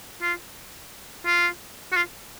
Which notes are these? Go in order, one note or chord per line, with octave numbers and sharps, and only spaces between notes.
F4
F4
F#4
F4